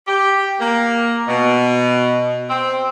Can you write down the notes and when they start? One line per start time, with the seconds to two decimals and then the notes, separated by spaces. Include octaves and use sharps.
0.08 G4
0.60 A#3
1.28 B2
2.50 C4